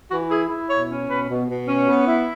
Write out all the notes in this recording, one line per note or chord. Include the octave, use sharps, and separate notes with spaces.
E3 F#4
E4 G#4
E4
B2 C#5
C#4
B2 B4
B2
B2
C#4
B3
E4